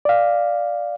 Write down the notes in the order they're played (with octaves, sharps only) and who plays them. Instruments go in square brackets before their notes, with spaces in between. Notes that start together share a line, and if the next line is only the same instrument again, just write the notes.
[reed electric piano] D5 F5